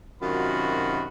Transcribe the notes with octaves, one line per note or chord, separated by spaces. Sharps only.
F#2 C3 D#3 F4 F#4 B5